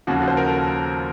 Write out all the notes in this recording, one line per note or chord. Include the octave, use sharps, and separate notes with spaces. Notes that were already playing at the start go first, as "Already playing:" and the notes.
D#2 C#3 F3 F#4
A4
C5
A#4
A4